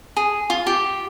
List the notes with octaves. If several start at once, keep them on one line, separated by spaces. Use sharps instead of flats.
G#4
F4
G4